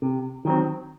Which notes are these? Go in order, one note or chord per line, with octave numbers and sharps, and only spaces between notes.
C3
D#3 F#3 C4